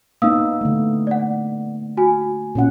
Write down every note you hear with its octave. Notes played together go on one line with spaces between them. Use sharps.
A#3 B3 D#4 F5 D#6 E6
D3 A3
D5 F#5
F#4 G#5
A#2 C#4 F#5